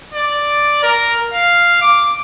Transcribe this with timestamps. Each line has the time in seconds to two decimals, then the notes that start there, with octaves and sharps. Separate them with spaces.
0.13 D5
0.83 A#4
1.34 F5
1.82 D6